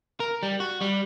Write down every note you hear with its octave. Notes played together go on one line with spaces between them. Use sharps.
A#4
G3
F#4
G3